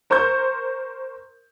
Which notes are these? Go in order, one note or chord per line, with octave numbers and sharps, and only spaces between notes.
A#4 C5 C6 C#6 G6